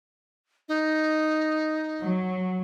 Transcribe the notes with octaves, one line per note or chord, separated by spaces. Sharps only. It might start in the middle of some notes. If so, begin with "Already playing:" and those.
D#4
F#3